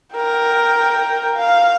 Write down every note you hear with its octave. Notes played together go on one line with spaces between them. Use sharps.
A#4 G5
F5